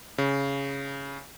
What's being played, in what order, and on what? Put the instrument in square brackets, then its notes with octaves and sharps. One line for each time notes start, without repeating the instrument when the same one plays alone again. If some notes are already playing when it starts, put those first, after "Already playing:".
[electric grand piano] C#3